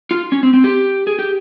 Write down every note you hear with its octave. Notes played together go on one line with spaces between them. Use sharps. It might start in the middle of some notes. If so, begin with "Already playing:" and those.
F4
C#4
C4
C4
G4
G#4
G4